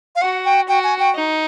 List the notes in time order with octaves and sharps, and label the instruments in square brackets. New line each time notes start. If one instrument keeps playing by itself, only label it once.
[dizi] F5
[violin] F#4 [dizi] F#5
[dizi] G5
[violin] F#4 [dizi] G5
[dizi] G#5
G5
[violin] D#4